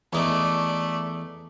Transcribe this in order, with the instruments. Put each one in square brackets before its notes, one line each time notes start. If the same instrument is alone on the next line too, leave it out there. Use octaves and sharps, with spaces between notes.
[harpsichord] E2 D#4 [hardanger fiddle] A3 D5